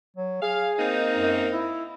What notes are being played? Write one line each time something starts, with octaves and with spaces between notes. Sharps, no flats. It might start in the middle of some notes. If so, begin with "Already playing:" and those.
F#3
G#4 F5
A#3 C4 D#4
F#2
E4